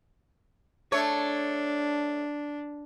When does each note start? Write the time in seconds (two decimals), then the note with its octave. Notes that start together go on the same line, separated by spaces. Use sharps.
0.92 A3 D4 C#5